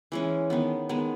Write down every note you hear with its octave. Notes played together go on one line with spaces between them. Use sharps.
E3 G#3 C#4
D#3 G#3 B3
D#3 G#3 B3